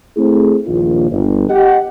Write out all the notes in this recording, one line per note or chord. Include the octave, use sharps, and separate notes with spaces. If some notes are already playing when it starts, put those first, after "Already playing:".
A3 C4 E4 G#4
A#1 D#2 F4
G1
G4 D#5 F#5